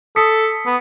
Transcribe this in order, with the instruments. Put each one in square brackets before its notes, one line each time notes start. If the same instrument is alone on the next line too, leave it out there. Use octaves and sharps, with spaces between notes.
[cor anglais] A4 [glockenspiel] D#6 B6 C#7
[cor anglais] B3